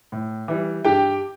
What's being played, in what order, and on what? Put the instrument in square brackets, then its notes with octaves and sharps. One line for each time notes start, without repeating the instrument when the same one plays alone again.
[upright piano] A2
E3 G3
G2 G4 G5